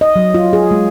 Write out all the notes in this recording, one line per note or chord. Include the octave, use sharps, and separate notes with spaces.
D#5
F#3
F4
G#4
G#3